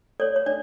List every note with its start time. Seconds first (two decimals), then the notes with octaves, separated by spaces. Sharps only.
0.20 A4 C#5 D5
0.36 C#5
0.46 D4 D5